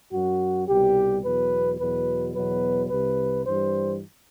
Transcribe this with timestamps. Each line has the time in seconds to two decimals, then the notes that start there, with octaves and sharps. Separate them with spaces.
0.12 F#2 F#3 F#4
0.68 C2 B2 G3 G4
1.23 E2 B2 F#3 B4
1.79 E2 B2 F#3 B4
2.34 E2 B2 F#3 B4
2.90 C2 C3 G3 B4
3.46 G2 E3 G3 C5